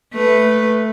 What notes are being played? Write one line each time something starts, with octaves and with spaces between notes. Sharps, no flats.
A3 B4